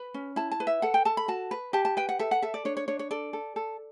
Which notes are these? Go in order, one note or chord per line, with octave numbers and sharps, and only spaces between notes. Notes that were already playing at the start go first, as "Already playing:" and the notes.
Already playing: B4 B5
C#4
E4 A5
A5
B4
E5
A4 F#5
G5
A4 A5
B5
F#4 A5
B4
G4 A5
A5
B4 G5
F#5
A4 E5
F#5
A4 E5
D5
D4 C#5
C#5
D4 C#5
C#5
A4 D5
A4
A4